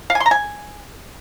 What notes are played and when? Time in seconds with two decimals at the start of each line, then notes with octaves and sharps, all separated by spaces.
0.10 F5
0.15 G#5
0.20 C6
0.26 A#5
0.31 G#5